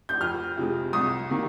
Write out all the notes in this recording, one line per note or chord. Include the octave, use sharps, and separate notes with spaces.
G6
F2 F6
C3 F3 G#3
C2 D#6
C3 D#3 A#3